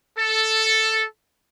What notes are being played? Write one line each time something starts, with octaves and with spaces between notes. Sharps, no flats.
A4